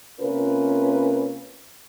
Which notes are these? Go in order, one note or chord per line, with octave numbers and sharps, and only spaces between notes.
C3 A#3 C#4 F4 A#4 B4